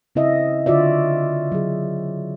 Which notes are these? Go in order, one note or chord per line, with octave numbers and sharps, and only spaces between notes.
C#3 C4 E4 D#5 E5
D3 F4 F#4 D5 E5
F#3 G#4